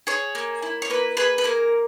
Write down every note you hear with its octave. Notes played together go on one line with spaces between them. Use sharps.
G#4 C#5
A#3
E4
C#5
A#3 B4
G#4 B4
B4
A#3 A#4